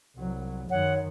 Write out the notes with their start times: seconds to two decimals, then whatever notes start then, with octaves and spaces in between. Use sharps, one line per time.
0.16 C2 F#3
0.70 F#2 D#3 C#5 F#5